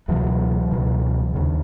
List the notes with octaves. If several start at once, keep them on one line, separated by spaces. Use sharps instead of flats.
C#2 B2 E3 F#3
C#2 B2
D#2 C#3